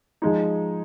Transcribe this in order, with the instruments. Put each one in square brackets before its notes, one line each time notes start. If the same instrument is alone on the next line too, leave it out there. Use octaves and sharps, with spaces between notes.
[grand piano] F3 G#3 D#4